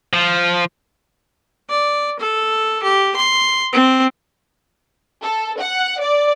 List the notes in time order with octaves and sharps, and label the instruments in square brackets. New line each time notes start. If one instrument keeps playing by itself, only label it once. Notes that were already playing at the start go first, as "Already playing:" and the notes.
[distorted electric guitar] F3
[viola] D5
A4
G4
C6
C4
[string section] A4
F#5
D5